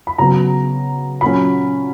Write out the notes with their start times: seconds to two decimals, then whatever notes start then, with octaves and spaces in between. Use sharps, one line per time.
0.07 B5
0.18 C#3 F#3 B3 A#5
1.21 A#2 F#3 C#4 B5